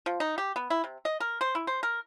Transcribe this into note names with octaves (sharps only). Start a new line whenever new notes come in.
F3
D#4
G4
B3
E4
C3
D#5
A#4
C5
E4
C5
A#4